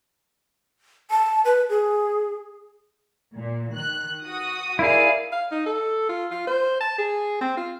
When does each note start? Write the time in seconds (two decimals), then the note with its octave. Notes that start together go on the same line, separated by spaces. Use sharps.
1.10 A5
1.45 B4
1.69 G#4
3.35 A#2
3.73 D#3 F#6
4.24 F#4 D#6
4.79 E4 G#4 A#4 D5 F5
5.32 F5
5.52 D#4
5.66 A4
6.09 F4
6.31 F4
6.47 C5
6.81 A5
6.98 G#4
7.41 C4
7.57 F4